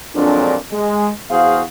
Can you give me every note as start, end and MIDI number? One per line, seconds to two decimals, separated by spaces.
0.15 0.55 41
0.15 0.55 46
0.15 0.55 54
0.15 0.55 56
0.15 0.55 60
0.15 0.55 62
0.72 1.10 56
1.30 1.61 40
1.30 1.61 66
1.30 1.61 68
1.30 1.61 72
1.30 1.61 77